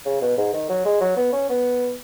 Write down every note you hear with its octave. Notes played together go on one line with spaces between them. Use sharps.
C#3
B2
G#2
D#3
F#3
G#3
F#3
B3
C#4
B3